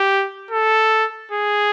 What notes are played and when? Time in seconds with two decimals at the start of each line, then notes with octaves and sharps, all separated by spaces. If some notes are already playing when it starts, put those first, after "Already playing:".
Already playing: G4
0.51 A4
1.31 G#4